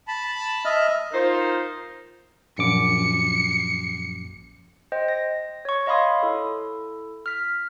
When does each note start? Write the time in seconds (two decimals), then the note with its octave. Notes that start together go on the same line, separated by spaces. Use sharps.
0.08 A5 B5
0.65 D#5 E5 F6
1.13 D#4 F4 A#4 C5
2.58 A#1 F#2 D6 C#7
4.92 C5 D#5 G5
5.08 A#6
5.65 C#5 C#6
5.86 C#5 D#5 F5 B5 C6 D#6
6.23 E4 A4
7.26 F6 B6